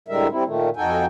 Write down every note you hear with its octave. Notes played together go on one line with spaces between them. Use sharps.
A2 D3 G3 G#3 A#4 E5
G3 C4 E4
A#2 D#3 A3
F2 D#4 F#4 A4 G5 G#5